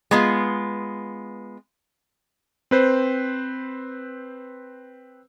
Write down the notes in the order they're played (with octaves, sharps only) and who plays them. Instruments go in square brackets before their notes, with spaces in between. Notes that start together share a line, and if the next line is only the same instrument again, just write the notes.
[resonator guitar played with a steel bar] G#3 B3 F4
[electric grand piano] C4 B4 C5